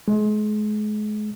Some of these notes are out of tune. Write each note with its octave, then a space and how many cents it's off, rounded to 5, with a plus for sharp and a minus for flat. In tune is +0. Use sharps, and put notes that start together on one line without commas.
G#3 +35